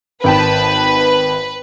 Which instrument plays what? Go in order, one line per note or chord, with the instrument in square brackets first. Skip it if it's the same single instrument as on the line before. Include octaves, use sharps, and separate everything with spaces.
[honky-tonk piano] G#1 G5 A5 [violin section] B4